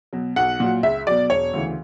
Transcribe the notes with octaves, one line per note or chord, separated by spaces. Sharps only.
B2 F#3
B1 F#5
A#2 F#3
C#2 E5
B2 F#3 D5
E1 C#5
D2 C#3 E3